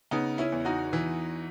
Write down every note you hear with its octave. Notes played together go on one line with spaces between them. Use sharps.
C#3 B3 D#4
C#4 E4
E2
D#4 F#4
E3